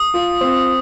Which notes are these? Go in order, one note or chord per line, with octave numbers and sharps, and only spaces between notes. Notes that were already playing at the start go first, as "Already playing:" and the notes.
Already playing: D#6
F4
C4